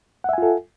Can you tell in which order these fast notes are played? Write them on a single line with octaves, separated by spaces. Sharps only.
F#5 E5 G#5 F4 A4